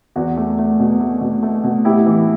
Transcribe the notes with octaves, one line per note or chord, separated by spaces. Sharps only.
E2 F#4
A3
A3
B2
A3
B2
A3
B2
A2 E4 G4
E3